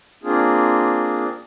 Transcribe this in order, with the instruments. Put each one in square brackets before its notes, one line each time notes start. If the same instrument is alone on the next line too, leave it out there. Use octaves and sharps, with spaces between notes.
[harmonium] A#3 C4 D4 F4 G#4